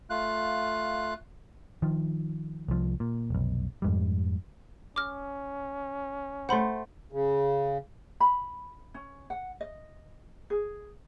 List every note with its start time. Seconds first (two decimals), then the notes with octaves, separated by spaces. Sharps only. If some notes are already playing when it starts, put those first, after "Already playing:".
0.10 A3 F4 F5 F#6
1.82 D#3 F3
2.68 C2 F3
3.00 A#2
3.30 F1 B1
3.82 F2 G#2 G3
4.96 C#4 D6 F6
6.49 A3 C5 F#5 B5 C6
7.12 C#3
8.20 B5
8.94 C#4
9.30 F#5
9.61 D#5
10.50 G#4